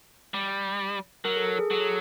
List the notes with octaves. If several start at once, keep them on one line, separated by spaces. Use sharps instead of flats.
G3
F#3 A#4
A4
A4
G#4
F#3 A4